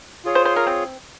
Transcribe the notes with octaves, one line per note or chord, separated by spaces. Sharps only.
F4 G#4 C#5
C5
C5
A#4
C4